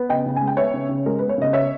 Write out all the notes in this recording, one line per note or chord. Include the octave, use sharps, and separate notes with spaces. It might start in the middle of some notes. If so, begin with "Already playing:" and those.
Already playing: B3
C#3 D#5 G5
C#3
G#5
G#3
G5
B3 C#5 E5
C#3
C#3
G#3 A#4
B3 B4
C#5
C#3 D#5
C#5 E5